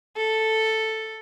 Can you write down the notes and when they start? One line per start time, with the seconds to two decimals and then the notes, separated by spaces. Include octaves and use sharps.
0.17 A4